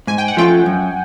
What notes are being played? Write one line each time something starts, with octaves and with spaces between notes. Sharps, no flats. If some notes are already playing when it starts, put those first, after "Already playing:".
G#2 G#5
G5
F#5
F3 A3 C#4 F4 G5
F#2